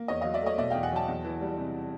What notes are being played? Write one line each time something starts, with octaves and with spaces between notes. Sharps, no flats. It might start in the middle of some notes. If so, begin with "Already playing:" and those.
Already playing: A#3
E2 C#5 D#5
F#3 D#5 F5
D5 E5
A3 C#5 D#5
B2 D5 E5
E2 F5 G5
F#5 G#5
F#3 G5 A5
E2
E3
G3
C3